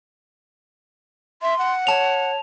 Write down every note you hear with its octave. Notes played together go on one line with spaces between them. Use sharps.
E5 C6
F#5
C#5 A5 F7